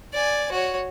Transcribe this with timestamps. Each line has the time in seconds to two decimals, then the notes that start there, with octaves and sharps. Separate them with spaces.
0.14 D5 G#5
0.52 F#4 C#5